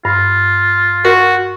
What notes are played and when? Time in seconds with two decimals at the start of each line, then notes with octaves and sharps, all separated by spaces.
0.05 G2 F4
1.05 F#4 A#4